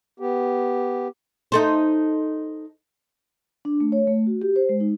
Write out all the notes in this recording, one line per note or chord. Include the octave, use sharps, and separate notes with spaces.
B3 G4
D#4 A4 C5
D4
A3
C#5
A3
F#4
G4
C5
G#3
D#4